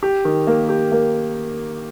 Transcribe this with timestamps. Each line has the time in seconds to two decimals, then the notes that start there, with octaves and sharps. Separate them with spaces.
0.03 G4
0.25 D#3
0.47 A#3
0.69 G4
0.92 A#3